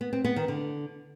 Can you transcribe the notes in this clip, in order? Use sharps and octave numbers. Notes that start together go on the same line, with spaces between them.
B3
C4
B3
D#3
D3